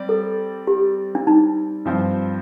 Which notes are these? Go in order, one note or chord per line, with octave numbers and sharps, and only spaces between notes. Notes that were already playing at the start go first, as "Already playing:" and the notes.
Already playing: G3 C4 D5
A4
G4
D4
D#4
G2 F3 C4 F4